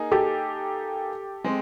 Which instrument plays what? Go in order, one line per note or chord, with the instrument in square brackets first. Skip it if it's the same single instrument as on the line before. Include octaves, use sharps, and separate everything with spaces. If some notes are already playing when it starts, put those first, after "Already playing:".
Already playing: [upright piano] A#3 D#4 G#4
[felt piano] G4 A4
[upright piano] G#3 C4